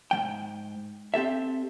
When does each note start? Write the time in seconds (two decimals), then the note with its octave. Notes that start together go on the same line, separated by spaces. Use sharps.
0.11 G#2 F3 G5
1.14 C4 G4 A4 E5